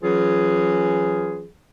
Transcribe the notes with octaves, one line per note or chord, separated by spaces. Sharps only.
E3 F#3 C#4 F4 G#4